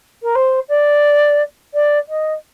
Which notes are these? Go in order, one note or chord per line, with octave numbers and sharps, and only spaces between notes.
A#4
C5
D5
D5
D#5